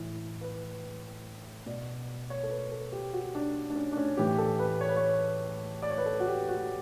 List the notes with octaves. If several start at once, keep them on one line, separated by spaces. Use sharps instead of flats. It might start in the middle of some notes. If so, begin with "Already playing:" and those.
Already playing: A2 E3
B4
B2 D5
C#5
A4
B4
A4
G4
F#4
D4
D4
C#4
D4
C#4
A2 E3 G4
A4
B4
C#5
B4
C#5
D5
C#5
B4
A4
F#4
G4
F#4